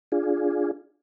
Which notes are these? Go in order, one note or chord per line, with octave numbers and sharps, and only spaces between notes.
D4 F4 G#4